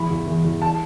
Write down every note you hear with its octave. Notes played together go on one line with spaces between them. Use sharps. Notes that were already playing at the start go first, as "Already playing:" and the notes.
Already playing: E2 B5
E2
E2
E2
A5